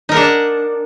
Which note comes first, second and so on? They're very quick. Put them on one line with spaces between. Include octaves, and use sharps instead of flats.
D#4 A#4 F#5 D4